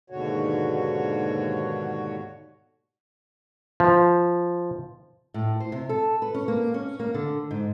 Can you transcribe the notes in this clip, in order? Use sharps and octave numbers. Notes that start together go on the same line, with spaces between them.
D#2 G#2 B2 D3 F#4 C#5
F3
A2
C5
C3
A4
B4
C#4
A#3
C#4
A#3
D3
G#2